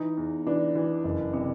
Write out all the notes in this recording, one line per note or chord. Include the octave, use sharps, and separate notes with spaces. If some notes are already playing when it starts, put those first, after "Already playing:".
Already playing: E3 D#4
E2
E3 D4
E3
F#1
C3